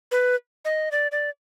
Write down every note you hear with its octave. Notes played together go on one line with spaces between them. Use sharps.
B4
D#5
D5
D5